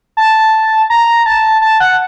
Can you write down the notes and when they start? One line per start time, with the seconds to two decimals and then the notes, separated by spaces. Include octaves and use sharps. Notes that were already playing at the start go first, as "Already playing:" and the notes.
0.17 A5
0.90 A#5
1.26 A5
1.62 A5
1.80 F#5